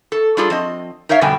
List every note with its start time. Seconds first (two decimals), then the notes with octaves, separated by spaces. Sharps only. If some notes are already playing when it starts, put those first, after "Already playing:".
0.12 A4
0.37 G3 D4 F4 G#4 A4 D5
0.50 F3 C4 D#5
1.09 D#4 A#4 C#5 E5 F5
1.21 F2 B2 D3 G3 G5 G#5